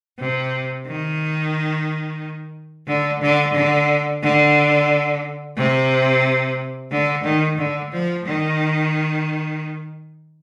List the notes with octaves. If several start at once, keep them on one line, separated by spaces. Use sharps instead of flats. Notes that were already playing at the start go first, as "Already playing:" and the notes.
C3
D#3
D3
D3
D3
D3
C3
D3
D#3
D3
F3
D#3